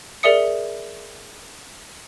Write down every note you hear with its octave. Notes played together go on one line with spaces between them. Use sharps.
G#4 A#4 D5 E5 D#6 C#7